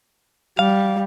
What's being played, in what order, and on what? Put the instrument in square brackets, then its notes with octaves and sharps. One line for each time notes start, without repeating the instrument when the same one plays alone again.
[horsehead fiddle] G3 [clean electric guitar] F5